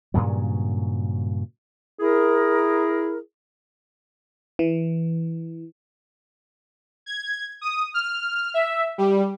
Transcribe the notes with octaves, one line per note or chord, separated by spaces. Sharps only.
G2 A#2 C#3 F#3
E4 G#4 A#4
E3
G#6
D#6
F6
E5
G3